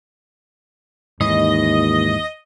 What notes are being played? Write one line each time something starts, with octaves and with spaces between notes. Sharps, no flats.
D#2 G#2 E3 C#4 D#5